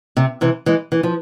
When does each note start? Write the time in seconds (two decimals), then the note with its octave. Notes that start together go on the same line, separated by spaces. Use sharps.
0.17 C3
0.41 C3 E3
0.66 E3 G#3
0.92 E3
1.03 F3